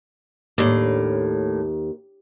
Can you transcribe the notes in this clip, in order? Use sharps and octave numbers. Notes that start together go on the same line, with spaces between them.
D#2 A2 D4